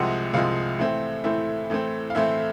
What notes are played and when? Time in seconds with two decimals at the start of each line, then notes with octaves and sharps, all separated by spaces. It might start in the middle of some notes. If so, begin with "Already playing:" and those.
Already playing: C2 C3 F3 G#3 F#5
0.33 C2 C3 F3 G#3 F5
0.79 A2 E3 A3 C4
1.24 A2 E3 A3 C4 E5
1.70 A2 E3 A3 C4
2.10 F5
2.15 A2 E3 A3 C4 E5